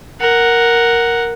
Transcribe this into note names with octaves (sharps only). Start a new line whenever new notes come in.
A#4 F#5